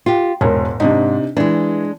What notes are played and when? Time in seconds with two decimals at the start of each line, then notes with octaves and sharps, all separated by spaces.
0.06 F4 G4
0.41 E1 G#2 A#4
0.80 G#2 C3 D4 D#4
1.37 E3 G#3 D4